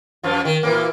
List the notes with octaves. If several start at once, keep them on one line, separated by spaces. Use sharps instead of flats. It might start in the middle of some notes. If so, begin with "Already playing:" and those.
F#2 F3 F4
D#3
A#2 E3 A#3